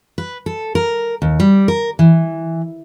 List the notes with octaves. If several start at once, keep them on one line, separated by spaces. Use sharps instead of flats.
B4
A4
A#4
D#2
G3
A#4
E3